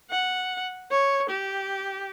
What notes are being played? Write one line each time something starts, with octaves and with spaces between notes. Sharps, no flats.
F#5
C#5
G4